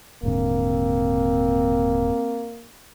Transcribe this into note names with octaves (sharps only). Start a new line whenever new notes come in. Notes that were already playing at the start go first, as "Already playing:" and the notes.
D#1 G#2 D3 A#3 C4